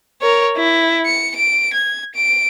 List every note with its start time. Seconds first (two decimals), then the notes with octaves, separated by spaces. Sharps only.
0.22 A#4 C#5
0.57 E4
1.06 C#7
1.36 D7
1.73 G#6
2.15 D7